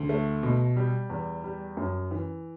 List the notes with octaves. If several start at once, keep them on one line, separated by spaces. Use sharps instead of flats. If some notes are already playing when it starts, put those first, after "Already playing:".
Already playing: D2
A3
B2
G3
E2
G3
F#2
E3